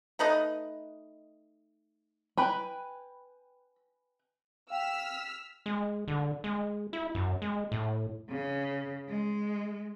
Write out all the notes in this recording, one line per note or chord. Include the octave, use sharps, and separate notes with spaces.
A3 D#4 B4 D#5
B4 G5 G#5 B5
F5 G5 E6 F6 B6
G#3
D3
G#3
E4
F#2
G#3
A2
C#3
G#3